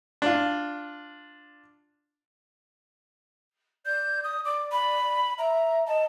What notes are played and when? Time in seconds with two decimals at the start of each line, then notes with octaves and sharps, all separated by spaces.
0.22 D4 F4
3.86 D5 G6
4.24 D#6
4.45 D5 D6
4.72 B5
5.38 E5 A#5
5.87 D#5 A5